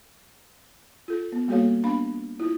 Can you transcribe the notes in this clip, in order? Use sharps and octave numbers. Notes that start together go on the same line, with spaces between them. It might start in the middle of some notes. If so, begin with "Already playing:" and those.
F4 A4
B3
G3 A#3 F#4 A4 C#5 F5
B3 D4 F5 B5
E4 F4